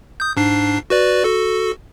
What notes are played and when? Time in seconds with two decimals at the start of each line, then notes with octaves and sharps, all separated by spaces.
0.20 D#6 G6
0.37 G#2 D4 C7
0.90 F#4 B4 D5
1.24 F#4 A4